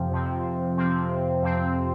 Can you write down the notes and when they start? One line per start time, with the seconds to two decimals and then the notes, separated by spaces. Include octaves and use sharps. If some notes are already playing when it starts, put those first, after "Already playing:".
Already playing: F2 C3 F3 C4
0.12 F2 C3 F3 C4
0.77 F2 C3 F3 C4
1.42 F2 C3 F3 C4